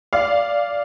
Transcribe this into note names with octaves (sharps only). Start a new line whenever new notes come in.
D5 F5